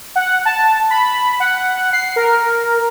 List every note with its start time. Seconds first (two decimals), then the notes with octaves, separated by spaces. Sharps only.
0.16 F#5
0.45 A5
0.90 B5
1.40 F#5
1.93 C7
2.16 A#4